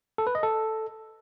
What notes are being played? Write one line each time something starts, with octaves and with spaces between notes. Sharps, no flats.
A4
B4
D#5
A4